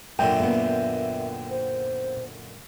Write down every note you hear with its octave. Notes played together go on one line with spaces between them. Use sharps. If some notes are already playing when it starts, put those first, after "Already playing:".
F#2 A#2 D3 E5 G5
A#3 B3
C5